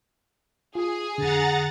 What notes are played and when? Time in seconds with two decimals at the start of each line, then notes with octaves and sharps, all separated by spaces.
0.75 F4 G#4
1.18 F2 D3 F#5 A#5 A6